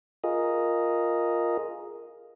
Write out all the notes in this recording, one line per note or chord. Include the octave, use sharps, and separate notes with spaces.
F4 G#4 A#4 D#5